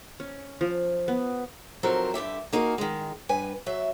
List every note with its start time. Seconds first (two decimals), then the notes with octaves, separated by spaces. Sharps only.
0.20 C#4
0.61 F3
1.08 B3
1.83 F3 F#3 C4 D#4 A4 A#4
2.14 G2 D3 G4 E5
2.53 A#3 D#4 F#4 G#4 A#4
2.78 D#3 G#3
3.29 G2 B4 G#5
3.66 F#3 E5